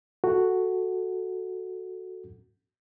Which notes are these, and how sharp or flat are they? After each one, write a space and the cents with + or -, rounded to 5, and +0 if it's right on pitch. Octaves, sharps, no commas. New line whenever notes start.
F#4 +0 A4 +0